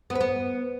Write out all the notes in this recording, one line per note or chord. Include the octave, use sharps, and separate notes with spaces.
B3
B4
B3